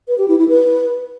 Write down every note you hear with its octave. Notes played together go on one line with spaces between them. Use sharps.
B4
G4
E4
E4
B4